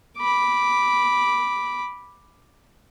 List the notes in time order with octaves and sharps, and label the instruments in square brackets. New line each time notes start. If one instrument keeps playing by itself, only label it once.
[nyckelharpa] B5 D6